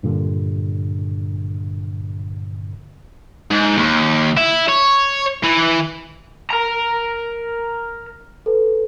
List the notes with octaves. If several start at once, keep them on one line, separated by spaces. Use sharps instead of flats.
G2 A#2 D3
G#2
D#2
E4
C#5
E3
A#4 A#5
A4 B4